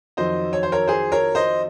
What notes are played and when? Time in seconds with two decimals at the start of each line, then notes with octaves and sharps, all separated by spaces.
0.17 F2 D#3 F#3 C5 D#5
0.53 C#5
0.63 C5
0.72 A#4 C#5
0.87 G#4 C5
1.12 A#4 C#5
1.35 C5 D#5